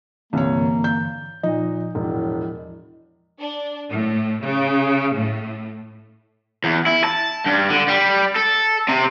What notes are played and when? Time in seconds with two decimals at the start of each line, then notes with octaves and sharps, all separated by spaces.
0.33 C2 G2 D3 E3 A#3 C#5
0.84 G6
1.43 A#2 F3 D#4 D#5
1.95 E1 A2
3.39 D4
3.90 A2
4.43 C#3
5.14 A2
6.64 E2
6.86 E4
7.04 A5
7.46 G2
7.70 D3
7.88 G3
8.36 A4
8.89 C3